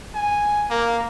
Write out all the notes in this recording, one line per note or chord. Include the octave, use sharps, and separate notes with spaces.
G#5
A#3